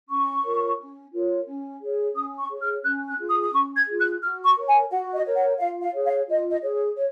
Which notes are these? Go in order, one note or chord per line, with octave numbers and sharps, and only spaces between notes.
C#4 C#6
F4 A#4 C#5
C#4
F4 A#4 C#5
C#4
G#4 C#5
C#4 D#6
C#6
G#4 C#5
F6
C#4 F#6
F#6
F4 G#4
D#6
D#6
C#4 C#6
G#6
F4 G#4
F#6
F#4 F6
C#6
A#4 C#5
G#5
F#4 F#5
D#5
A#4 C#5
F#5
F4 F5
F5
G#4 C#5
F5
F4 D#5
D#5
G#4 C#5
C#5
C#5